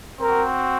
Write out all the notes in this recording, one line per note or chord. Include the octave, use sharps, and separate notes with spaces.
C4 F#4 A#4